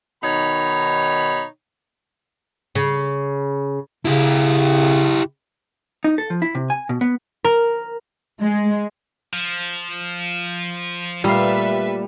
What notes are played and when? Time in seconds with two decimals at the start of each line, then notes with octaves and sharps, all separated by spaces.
0.23 B2 D#3 D#4 C#5 B5
2.75 C#3
4.05 C#3 E4 G4
6.04 D#4
6.18 A4
6.30 F3
6.42 E4
6.55 C3
6.70 G#5
6.89 B2
7.01 B3
7.44 A#4
8.41 G#3
9.33 F3
11.24 A#2 G3 A3 B4 E5 F5